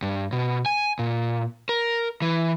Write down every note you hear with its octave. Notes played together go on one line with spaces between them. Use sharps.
G2
B2
G#5
A#2
A#4
E3